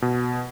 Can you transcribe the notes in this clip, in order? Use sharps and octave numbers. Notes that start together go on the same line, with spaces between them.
B2